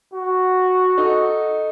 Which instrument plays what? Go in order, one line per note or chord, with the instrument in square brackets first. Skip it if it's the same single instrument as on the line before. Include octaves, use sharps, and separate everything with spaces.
[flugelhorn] F#4
[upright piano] D#4 A4 D#5